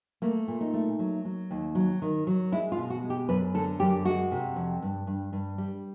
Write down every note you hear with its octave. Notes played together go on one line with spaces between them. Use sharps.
A3 A#3
A#2
D#4
A3
F#3
F#3
D#2
F#3
D#3
F#3
G#3 E4
F4
B2
F#4
G#3
G4
F#2 B4
D3 A4
F#2 G4
G#3 F#4
C3
F2
G2
G2
G2
G3